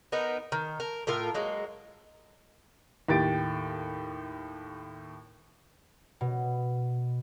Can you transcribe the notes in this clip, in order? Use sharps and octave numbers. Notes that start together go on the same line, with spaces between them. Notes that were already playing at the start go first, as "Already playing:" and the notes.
B3 D#4 A#4 B4
D#3
A#4
A2 F4 A#4
F#3 G#3 A#3
D#2 A2 G4 A6 D7
B2